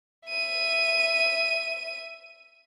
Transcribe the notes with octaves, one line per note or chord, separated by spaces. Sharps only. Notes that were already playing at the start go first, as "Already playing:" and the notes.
E5 D#7